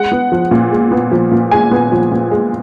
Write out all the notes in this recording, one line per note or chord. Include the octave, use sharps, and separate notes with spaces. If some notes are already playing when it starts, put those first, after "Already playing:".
Already playing: G#3 F#5
B3
F3
A#2
G#3
B3
F3
A#2
G#3 G#5
B3
F3
A#2
G#3